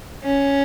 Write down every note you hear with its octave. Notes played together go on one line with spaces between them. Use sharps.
C#4